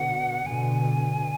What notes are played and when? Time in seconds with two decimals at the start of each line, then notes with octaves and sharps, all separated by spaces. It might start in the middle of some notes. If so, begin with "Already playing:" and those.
Already playing: B2 D3 F#5
0.46 B2 D3 G#5